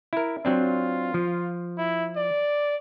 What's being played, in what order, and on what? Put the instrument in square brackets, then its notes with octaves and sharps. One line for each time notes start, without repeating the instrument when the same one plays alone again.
[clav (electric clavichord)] E4 A#4
[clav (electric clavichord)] F#3 C4 D4 [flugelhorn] F4
[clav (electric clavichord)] F3
[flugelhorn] E4
D5